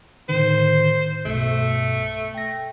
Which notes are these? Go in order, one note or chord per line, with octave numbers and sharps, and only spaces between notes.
A2 D3 D#3 C5
B1 G2 B2 A3
G5 A#6